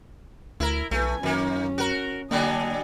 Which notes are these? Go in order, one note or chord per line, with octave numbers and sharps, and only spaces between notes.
D2 E4 A#4
B1 A3 B4 G#5
F#2 D#3 A#3 C#4
F#4 A#4
D3 F#3 A#3 D4 D#5 G#5